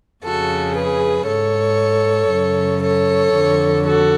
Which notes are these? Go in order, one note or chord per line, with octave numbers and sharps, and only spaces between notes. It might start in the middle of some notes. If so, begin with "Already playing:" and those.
F2 C#3 F#4 A4
G#4 B4
G#2 A4 C#5
F#2 C#3
A4 C#5
F2 D3
F#4 A4